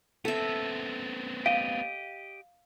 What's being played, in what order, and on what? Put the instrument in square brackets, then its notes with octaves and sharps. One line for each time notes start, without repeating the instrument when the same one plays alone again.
[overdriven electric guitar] B3 C4 [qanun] A4 E5
[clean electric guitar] G4 D#5 [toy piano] F5